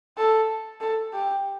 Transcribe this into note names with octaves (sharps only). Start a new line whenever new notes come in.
A4
A4
G4